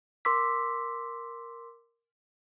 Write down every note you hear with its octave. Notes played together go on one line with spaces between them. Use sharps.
A#4 C6 D6 E6 B6